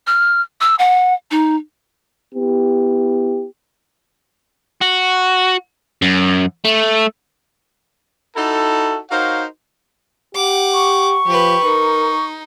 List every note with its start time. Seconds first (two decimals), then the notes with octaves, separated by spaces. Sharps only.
0.07 F6
0.61 E6
0.79 F#5
1.31 D#4
2.35 B3 E4 G4
4.82 F#4
6.02 F#2
6.65 A3
8.36 D#4 E4 F#4 A4
9.10 D#4 F#4 A#4 C5 C#5 F5
10.35 G4 F#5 D6
10.74 C#6
11.27 F3 G4 B4
11.65 D#4 A#4